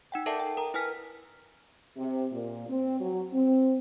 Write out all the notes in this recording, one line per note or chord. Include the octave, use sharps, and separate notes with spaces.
D#4 F#5 G5
A4 A#4 D5 E5 A5 C7
G5
A#4 A#5
E4 B4 G#5 F6 B6
C3
A#2
C4
F#3
C4